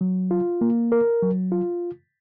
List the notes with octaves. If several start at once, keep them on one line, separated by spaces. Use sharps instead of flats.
F#3
F4
A#3
A#4
F#3
F4